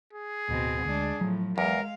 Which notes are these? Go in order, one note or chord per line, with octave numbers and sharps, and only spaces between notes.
G#4
D1 B2 C4
D2 G#3 D4
A2 F3 F#3
E2 G#3 A#4 F5